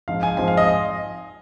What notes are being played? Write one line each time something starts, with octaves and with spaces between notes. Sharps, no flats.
G#2 F3 C4 F4 F5
G#5
G#2 F3 C4 F4 G#5
F5
D#5